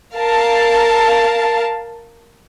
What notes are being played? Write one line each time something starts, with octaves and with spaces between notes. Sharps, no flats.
A#4 F5 A5